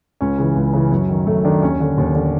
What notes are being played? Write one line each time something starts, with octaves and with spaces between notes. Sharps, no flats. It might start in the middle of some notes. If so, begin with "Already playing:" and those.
C#2 C#4
C#3 E3
C#2
C#3 E3
F#2
D#3
F#2 A3
D#3 D4
D#2 C#4
D3
D#2
D3